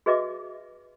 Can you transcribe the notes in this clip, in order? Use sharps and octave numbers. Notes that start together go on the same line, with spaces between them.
F#4 G#4 B4 D#5 E5 D6